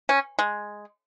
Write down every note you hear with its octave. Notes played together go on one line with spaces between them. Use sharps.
C#4
G#3